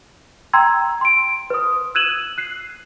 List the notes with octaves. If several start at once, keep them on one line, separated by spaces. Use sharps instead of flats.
G5 A#5 C6 E6 G#6
C6 D7
B4 D#6
E6 F#6 G#6 D#7 E7 F#7
F#6 C7